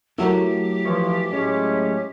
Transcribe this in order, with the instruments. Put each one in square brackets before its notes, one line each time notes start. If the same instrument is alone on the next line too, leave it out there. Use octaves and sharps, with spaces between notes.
[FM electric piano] F#3 A3 [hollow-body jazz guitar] E4 A#4 [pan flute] G4
[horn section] E3 F3 [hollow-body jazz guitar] C#5
[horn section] A2 G#3 C#4